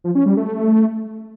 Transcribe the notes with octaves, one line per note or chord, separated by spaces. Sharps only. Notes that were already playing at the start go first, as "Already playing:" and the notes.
F3
C#4
G3
A3